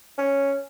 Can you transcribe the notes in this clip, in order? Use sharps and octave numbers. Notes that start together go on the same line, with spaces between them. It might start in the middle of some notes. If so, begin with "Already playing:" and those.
C#4